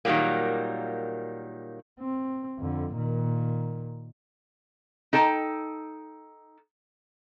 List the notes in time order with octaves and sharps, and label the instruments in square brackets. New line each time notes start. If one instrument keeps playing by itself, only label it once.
[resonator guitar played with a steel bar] A#2 D#3 E3 F#3 G3 A#3
[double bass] C4
F2 D3
A#2 D#3
[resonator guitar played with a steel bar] D#4 A4 G5 A5